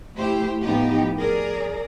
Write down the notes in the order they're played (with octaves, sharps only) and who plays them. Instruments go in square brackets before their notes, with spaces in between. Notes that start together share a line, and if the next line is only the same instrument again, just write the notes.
[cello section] A3 E4 G4 C5
A2 F3 B3 D#4 G4
G#4 A#4 D5